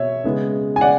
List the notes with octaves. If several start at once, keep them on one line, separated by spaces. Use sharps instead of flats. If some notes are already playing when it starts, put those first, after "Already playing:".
Already playing: B2 C#5 E5
C#3 G#3 B3
G#5
D5 F#5